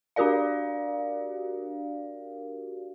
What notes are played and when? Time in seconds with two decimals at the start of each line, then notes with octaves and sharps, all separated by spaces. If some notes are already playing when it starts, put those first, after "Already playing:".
0.16 D4 F#4 G4 A#4 D5 F5